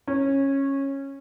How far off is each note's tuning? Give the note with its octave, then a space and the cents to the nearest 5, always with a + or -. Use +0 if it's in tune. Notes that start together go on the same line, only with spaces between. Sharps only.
C#4 -15